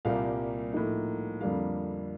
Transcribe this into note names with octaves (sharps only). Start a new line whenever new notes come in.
C2 A#2 G3 A#3 F5
A2 F3 A#3 D#4
F2 D3 G3 A#3 F5